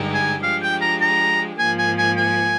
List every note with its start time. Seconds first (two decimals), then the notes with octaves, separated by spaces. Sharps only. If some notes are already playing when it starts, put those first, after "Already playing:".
Already playing: G2 D3 G#3 D#4 G4
0.14 G#5
0.43 F3 G#3 D4 G4 F5
0.62 G5
0.82 A#5
1.01 A#5
1.59 G#2 F3 A#3 G#5
1.78 G#5
1.98 G#5
2.17 G#5